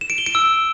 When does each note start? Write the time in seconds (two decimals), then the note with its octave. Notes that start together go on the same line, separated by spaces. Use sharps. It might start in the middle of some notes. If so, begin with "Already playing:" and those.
0.01 E7
0.10 D7
0.18 G7
0.26 D7
0.35 E6